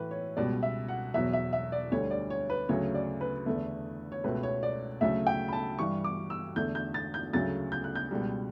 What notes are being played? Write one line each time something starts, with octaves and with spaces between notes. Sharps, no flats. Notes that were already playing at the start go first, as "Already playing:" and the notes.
Already playing: A2 E3 A3 B4
C#5
C#2 B2 G3 D5
E5
F#5
E2 B2 F#3 E5
E5
E5
D5
D2 D3 G3 C#5
D5
C#5
B4
D2 C#3 F#3 A3 C#5
D5
B4
E2 D3 A3
C#5
C#2 B2 A3 B4
C#5
D5
D2 C#3 F#3 A3 E5
G5
B5
A5
G2 E3 G3 C#6
D6
E6
E2 D3 A3 G6
G6
A6
G6
D2 C#3 F#3 A3 A6
G6
F#6
G6
C#2 B2 G3